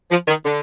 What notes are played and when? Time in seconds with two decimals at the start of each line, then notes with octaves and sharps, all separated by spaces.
0.10 F3
0.28 D#3
0.45 D3